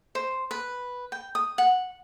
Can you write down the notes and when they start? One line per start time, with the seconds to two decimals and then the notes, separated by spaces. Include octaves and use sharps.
0.15 C5
0.51 B4
1.12 G5
1.35 D#6
1.58 F#5